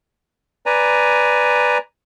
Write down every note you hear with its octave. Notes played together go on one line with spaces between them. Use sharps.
B4 D5 G#5 A#5